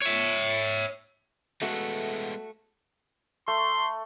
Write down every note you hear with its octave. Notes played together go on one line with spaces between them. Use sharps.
C#5 E5
G#3 A3 B3 F#4
A3 C6